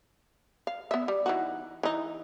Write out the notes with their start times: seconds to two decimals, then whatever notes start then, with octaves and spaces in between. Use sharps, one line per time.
0.67 F5
0.91 B3 E5
1.08 G3
1.26 E3 D#4 F#4
1.83 E3 D#4